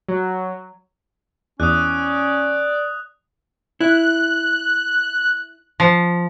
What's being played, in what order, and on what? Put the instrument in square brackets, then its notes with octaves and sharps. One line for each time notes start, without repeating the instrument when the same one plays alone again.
[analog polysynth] F#3
[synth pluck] E2 [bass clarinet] C#4 [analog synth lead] D5 [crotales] D#6 F#6
[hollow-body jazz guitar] E4 [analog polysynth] F#6
[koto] F3